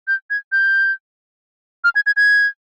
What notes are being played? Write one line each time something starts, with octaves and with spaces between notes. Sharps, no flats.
G6
G#6
G6
F6
G#6
G#6
G#6